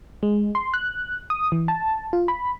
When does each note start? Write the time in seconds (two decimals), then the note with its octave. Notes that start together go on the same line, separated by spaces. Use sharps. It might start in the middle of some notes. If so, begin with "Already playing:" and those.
0.23 G#3
0.55 C6
0.74 F#6
1.30 D#6
1.52 E3
1.68 A5
2.13 F4
2.28 B5